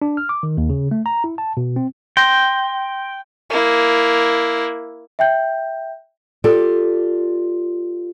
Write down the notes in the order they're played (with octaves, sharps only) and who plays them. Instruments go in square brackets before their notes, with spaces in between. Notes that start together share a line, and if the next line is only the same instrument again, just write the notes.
[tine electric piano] D4
F6
D6
D#3
D#2
C#3
A3
A#5
E4
A5
B2
C4
[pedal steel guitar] G5 [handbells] C6 G6 A#6
[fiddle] A#3 E4
[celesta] E5 G5 G6
[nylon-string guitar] F4 G4 A4 D5